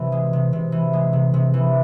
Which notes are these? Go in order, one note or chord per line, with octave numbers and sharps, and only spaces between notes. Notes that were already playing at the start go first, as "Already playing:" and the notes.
Already playing: C3 E3
G#3
C3
C3
E3
G#3
C3
C3
E3